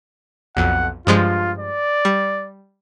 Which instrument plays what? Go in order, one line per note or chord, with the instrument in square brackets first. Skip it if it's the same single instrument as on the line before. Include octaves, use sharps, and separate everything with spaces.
[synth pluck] B1 F2 [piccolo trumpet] F#5
[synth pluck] G2 F3 G#3 [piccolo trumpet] F4
[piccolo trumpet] D5
[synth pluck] G3